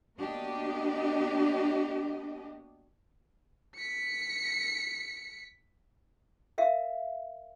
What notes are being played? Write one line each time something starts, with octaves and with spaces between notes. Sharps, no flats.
A#3 B3 D4 F#4 G4 D#5
B6 C#7
A#4 E5 F5